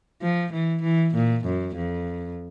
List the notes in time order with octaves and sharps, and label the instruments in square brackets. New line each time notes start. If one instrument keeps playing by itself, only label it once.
[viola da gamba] F3
E3
E3
A#2
F#2
F2